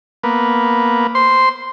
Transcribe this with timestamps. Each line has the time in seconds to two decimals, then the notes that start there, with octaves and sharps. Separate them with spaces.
0.23 A#3 B3
1.15 C5 C6